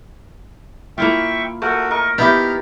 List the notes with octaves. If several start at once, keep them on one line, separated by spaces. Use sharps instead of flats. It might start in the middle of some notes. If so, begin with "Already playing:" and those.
A#3 E4 F4 E5 G5 C#6
A3 F#4 A#4
A#4 D#5 C#6
B3 D#4 E4 G4 F6